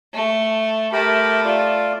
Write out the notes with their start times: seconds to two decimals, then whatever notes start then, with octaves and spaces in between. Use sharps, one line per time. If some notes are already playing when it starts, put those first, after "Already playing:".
0.14 A3
0.93 A3 G4 A#4 B5
1.45 F4 D5